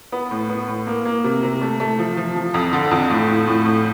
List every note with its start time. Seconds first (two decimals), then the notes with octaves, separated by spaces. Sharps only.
0.12 B3
0.31 A2
0.49 B3
0.68 A2
0.87 A#3
1.05 A#3
1.24 C3
1.43 C3
1.61 A3
1.80 A3
1.99 F3
2.17 F3
2.36 F3
2.54 F2
2.73 D3
2.91 F2
3.10 A2
3.29 A2
3.47 A2
3.66 A2